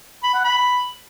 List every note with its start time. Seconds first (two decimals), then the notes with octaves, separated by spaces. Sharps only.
0.23 B5
0.34 F#5
0.44 B5